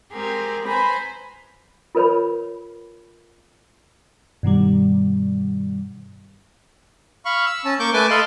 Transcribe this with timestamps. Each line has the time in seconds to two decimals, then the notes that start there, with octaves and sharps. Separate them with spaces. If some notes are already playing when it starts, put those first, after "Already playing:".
0.12 G#3 C4 G4 G#4 A#4
0.66 B4 C5 G#5 A#5 B5
1.95 F4 A#4 B4 C#5 B5
4.43 G2 B2 D#3 G3
7.25 F5 B5 C#6
7.46 E6
7.65 C#4 A5
7.80 A#3 C#6 D6 G6
7.93 A3 B4 G#5 A5 D6
8.10 A4 D#5 F5 A5 B5 C6